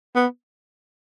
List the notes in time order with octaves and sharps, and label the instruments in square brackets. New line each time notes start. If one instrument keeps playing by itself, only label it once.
[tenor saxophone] B3